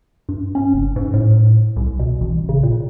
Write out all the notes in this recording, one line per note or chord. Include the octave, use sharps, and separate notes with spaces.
G2
C#4
F#1
G#2
A2
C2
B2
A1
C#3
A#2